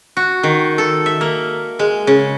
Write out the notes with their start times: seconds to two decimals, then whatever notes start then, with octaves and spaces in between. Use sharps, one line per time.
0.17 F#4
0.43 D#3
0.78 A4
1.06 E5
1.21 A#3
1.79 G#3
2.07 C#3